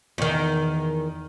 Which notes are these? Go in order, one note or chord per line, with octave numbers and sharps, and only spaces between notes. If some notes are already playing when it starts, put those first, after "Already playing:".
E2 D#3